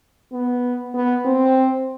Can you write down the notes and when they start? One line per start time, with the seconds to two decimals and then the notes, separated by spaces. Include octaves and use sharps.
0.32 B3
0.94 B3
1.25 C4